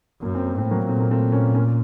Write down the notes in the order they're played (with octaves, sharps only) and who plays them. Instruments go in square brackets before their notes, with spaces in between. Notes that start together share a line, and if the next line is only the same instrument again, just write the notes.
[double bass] F#2 [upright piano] A#3
[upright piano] C4
A#3
[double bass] A2 [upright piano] C4
[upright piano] F#3 A#3
[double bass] A#2 [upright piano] A3 C4
[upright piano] A#3
A3 C4
A#3 C#4
A#3 C#4